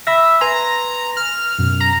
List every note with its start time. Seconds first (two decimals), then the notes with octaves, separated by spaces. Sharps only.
0.07 E5 B5 E6 A#6
0.41 B4 G#5 A#5 C6
1.17 F6
1.59 F#2 B2
1.80 A#5